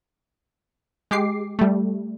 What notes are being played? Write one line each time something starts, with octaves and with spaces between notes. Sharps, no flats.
G#3 G4 D6 C7
G3 A3